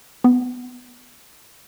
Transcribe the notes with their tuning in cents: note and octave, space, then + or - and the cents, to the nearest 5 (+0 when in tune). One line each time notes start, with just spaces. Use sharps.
B3 +15